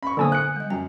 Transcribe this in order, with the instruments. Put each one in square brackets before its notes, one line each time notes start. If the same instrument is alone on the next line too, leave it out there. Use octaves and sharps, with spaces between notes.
[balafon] C#4 [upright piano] B5 C#6
[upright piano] A#2 [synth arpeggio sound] D3 G#5 D#6 [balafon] F#3 B3 C5
[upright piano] F#6 C#7
[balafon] G3 D#5
[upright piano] F#2 [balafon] G5